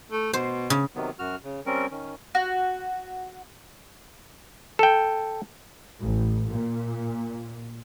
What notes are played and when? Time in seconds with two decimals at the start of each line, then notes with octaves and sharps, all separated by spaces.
0.12 A3
0.33 B2 C5
0.70 C#3
0.94 C3 D#3 F#3 B3
1.19 F#2 F#4 F6
1.44 C#3
1.66 G3 C4 C#4 A#4
1.91 D#3 C#4
2.35 F#4
4.79 A4 G5
6.00 A1
6.51 A#2